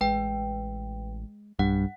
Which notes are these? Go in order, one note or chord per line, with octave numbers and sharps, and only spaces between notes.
A1 G#3 B4 G5
B1 G2 F#5